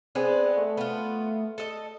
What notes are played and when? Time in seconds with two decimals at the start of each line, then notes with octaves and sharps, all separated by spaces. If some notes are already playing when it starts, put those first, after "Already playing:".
0.15 G#3 B3 C4 D4
0.57 A3
0.77 B3 F4
1.58 A4 D#5